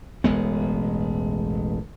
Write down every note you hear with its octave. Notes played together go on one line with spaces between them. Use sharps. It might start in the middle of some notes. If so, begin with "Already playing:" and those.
E1 A1 G#3 B3